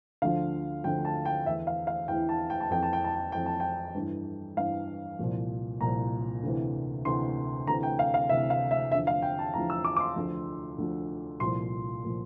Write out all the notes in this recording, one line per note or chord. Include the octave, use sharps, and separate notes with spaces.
D2 D3 F3 F5
D2 D3 F3 G5
A5
G5
E2 E3 E5
F5
F5
E2 E3 G5
A5
G5
A5
F2 E3 G5
A5
G5
A5
G5
F2 E3 G5
A5
G5
G2 E3
G2 E3 F5
C2 A#2 F3
C2 A#2 F3 A#5
D2 C3 E3
D2 C3 E3 C6
D2 C3 E3 A#5
G5
F5
F5
D2 C3 E3 E5
F5
E5
E2 D3 F3 E5
F5
G5
A5
E2 D3 F3 A#5
E6
D6
D6
C6
D2 D3 F3
D2 D3 F3
C2 A#2 F3 C6
A#2 F3